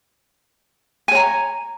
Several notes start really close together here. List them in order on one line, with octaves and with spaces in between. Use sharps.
G#5 C#5 A#5